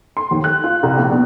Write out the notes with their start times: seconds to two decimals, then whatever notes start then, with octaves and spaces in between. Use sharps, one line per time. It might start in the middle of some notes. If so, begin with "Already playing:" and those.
0.17 C6
0.31 D#2
0.44 F#6
0.64 F4
0.83 C2
0.97 A#1
1.12 B2